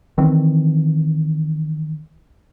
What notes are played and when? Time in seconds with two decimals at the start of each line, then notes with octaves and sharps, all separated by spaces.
0.18 D#3 E3 C4